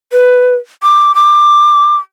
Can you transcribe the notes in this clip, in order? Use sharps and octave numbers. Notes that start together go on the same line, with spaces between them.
B4
D6
D6